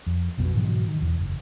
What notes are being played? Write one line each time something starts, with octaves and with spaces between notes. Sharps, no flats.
F2
A#1 F2 B2 F#3
G#2 B2 E3 F#3
D#3
E2
F#1